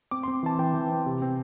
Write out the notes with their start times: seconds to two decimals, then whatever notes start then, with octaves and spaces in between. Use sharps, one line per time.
0.11 C4 D6
0.23 C6
0.28 C4
0.43 E3 A5
0.59 E3 G5
0.74 E3
0.91 C4
1.06 C3
1.22 C4